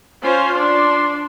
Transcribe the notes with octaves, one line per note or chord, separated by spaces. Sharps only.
C#4 F4 C5
D4 C6